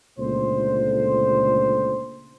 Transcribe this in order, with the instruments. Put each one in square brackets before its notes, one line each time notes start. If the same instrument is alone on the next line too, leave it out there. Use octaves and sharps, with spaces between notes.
[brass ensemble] C#2 A#2 D3 A3 C5